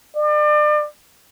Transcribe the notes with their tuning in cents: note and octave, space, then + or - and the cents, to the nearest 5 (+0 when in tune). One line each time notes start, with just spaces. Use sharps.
D5 +35